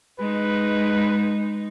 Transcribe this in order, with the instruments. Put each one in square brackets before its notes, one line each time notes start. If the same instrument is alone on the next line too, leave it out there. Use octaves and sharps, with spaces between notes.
[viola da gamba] G#3 D#4 [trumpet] B4